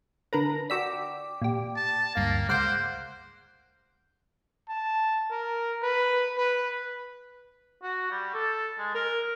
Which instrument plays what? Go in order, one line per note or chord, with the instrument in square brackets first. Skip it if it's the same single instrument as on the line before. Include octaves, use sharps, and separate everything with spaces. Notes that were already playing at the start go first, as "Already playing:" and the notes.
[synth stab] D3 A#4 B4 [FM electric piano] A#6
[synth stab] F#4 E6 B6 [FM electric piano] D5 G5 D6
[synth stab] A#2 G4
[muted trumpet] A5
[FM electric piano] D2 G2 F5 [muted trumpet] A#3
[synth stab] C#2 F5 D6 [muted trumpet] C5 [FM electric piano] F#5 C6 F#6
[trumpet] A5
A#4
B4
B4
[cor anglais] F#4
G3
A4
G#3
A#4